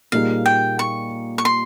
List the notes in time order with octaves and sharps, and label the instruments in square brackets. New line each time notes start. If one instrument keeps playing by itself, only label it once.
[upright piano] A#2 G3 A#3 D#4 G#4 [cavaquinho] F5
[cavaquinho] G5
C#6
C#6
C6